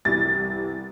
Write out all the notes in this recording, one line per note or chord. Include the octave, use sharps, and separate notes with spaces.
C2 C3 E3 A6